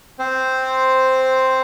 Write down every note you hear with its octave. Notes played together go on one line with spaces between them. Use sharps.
C4 C5